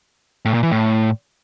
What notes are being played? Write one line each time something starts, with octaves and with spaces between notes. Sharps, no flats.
A2
A#2
E3
A2